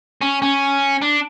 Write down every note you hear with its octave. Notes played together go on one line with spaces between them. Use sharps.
C#4
C#4
D4